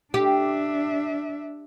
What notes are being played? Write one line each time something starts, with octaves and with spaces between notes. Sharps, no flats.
D4 G4 E5